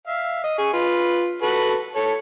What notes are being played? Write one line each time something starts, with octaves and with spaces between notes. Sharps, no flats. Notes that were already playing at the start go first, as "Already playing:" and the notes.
E5 F5
D#5
G#4 C#6
F4 B4
F#4 A4 B4
A4 C#5